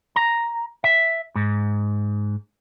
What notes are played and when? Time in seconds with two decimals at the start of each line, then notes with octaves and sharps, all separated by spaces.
0.16 A#5
0.84 E5
1.35 G#2